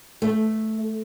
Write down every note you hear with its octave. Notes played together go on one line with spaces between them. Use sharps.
A3